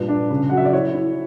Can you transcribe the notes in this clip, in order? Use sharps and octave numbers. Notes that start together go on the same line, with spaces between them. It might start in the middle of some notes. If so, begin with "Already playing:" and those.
Already playing: G2 A#2 B4
D4
C#3
F#3 F#5
E5
D5
E4 C#5
E4